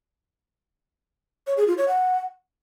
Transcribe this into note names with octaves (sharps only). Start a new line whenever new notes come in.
C#5
G#4
F4
C#5
F#5